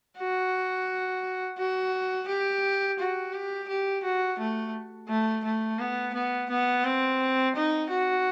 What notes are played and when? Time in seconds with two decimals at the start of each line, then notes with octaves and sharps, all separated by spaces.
0.17 F#4
1.58 F#4
2.28 G4
2.99 F#4
3.33 G4
3.68 G4
4.03 F#4
4.39 A3
5.08 A3
5.44 A3
5.79 B3
6.14 B3
6.49 B3
6.85 C4
7.55 D#4
7.89 F#4